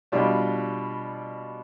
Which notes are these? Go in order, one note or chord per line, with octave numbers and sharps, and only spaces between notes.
B2 G3 D4 F4